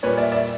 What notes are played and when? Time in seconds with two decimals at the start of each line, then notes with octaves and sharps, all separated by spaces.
0.03 A#2 G3 B4 C#5
0.17 D5 E5
0.32 D5 E5